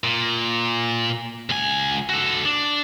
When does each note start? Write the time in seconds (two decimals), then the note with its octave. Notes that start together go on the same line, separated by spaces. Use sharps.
0.04 A#2
1.50 C#2 G#5
2.09 F#4 A4
2.45 D4